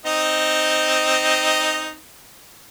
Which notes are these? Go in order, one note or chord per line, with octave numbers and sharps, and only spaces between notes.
C4 D#4 D#5